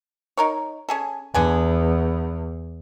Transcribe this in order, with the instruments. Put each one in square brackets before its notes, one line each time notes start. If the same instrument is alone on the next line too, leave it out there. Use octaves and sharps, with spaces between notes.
[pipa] D#4 A#4 C#5
C#4 G#4 A4
[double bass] E2 [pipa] D3 B3 G#5